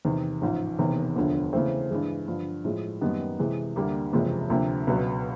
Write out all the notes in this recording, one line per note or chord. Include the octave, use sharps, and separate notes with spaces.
E2 C3 D#3
A1 G#2 F3
E1 E2 C3 D#3
E1 D2 D3 F3
C#3 E3 A3 C4
G2 E3 G#3
G2 D3 F3
A2 F3 G#3
F#2 D#3 G3 B3 D#4
C3 E3 G#3
D2 D3 G3 A#3
F#1 E2 C3 F3 G#3
D2 C3 F3 A#3
C#2 B2 F#3 B3